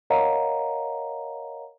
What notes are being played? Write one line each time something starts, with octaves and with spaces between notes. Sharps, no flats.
A#4 C#5 D#5 F5 F#5 A#5